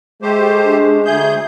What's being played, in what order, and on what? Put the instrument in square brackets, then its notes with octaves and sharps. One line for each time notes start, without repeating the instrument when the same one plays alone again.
[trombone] G#3 [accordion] A3 G4 C5
[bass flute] D4
[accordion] D2 G#4 G6 [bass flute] E5